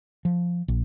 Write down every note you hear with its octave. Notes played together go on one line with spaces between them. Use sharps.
F3
A#1